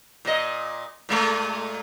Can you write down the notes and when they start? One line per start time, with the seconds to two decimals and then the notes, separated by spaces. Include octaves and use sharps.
0.25 A#2 D#5
1.09 A#2 G#3 A3